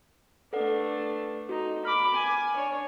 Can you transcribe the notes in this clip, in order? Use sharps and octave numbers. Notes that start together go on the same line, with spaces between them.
A3 D4 A4 B4 F#5
D#4 F#4
B5 D6 F6
G#5
D4 C#5